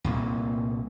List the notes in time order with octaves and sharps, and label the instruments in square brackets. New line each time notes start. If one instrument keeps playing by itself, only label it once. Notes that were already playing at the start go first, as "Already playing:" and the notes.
[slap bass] C2 A#2 A#3